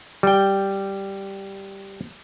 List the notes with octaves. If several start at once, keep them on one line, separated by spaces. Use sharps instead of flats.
G3 G5